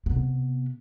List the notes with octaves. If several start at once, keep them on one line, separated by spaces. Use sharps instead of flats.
C3 B3